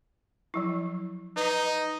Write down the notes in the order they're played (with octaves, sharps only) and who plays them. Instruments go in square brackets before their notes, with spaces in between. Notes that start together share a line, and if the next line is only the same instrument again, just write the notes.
[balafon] F3 F#3 E4
[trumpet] D#4 [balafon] B4 D#5